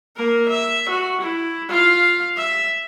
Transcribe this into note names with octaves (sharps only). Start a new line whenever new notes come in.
A#3 A#4
E5
F#4
E4
F4 F5
E5